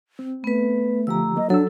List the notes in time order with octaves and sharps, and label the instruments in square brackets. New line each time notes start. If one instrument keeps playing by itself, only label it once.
[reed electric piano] C4
[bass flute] A3 [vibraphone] B3 B4
[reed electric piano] D3 F3 G4 [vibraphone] A#5 E6
[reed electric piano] F#3 A#3 [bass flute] D#5
[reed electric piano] F#3 E6 [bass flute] D4 [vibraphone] A4